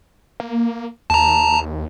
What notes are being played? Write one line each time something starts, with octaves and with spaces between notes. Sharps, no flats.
A#3
D#2 A5 A#5